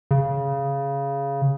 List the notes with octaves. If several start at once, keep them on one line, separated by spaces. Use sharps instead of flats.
C#3